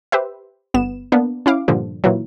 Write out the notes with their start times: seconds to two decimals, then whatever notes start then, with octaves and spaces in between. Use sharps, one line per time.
0.12 G4 B4 C5 E5
0.74 G1 B3 E7
1.12 A#3 B3 D4
1.46 C#4 E4 F5 D6
1.68 G2 A#2 D3 F3
2.04 A#2 E3 F#3